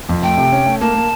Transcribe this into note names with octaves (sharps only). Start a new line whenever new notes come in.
F2
A3 G5
C3
C#4
A3
A#3 A5
A#3